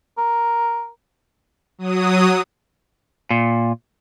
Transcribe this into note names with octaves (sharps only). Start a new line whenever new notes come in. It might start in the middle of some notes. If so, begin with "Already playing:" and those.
A#4
F#3 D#6
A#2